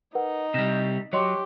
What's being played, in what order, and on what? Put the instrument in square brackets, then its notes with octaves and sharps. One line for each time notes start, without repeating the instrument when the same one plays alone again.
[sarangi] D#4 [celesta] A#4 B4 F#5
[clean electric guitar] C3 G3 [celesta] A#6 E7
[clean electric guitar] F#3 [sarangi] G4 [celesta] C#5 D#5 C6